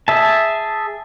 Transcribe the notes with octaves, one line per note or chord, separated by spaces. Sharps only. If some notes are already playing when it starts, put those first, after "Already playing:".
G#4 E5 A5